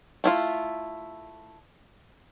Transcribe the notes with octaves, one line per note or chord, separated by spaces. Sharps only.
A3 E4 F4